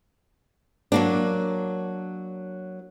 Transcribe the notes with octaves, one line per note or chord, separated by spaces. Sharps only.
F#3 A#3 D4